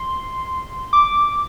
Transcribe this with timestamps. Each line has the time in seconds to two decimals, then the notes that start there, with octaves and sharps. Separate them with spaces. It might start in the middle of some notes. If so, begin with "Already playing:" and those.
Already playing: C6
0.93 D6